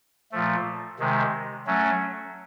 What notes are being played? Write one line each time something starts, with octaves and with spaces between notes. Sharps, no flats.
A#2 F3 A3
C3 D#3 G#3
F#3 A3 C#4